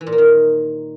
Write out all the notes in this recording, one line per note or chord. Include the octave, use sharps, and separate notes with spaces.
E3
A#2
A#3
D#3